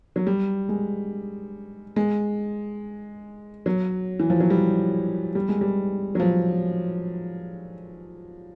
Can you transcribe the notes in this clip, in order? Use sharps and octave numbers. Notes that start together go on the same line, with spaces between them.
F#3
G3
G#3
G#3
F#3
E3
F3
F#3
G3
G3
G#3
G3
F#3
F3